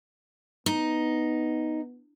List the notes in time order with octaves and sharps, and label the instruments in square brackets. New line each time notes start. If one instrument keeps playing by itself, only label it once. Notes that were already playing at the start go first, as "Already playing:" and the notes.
[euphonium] B3 [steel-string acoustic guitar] D#4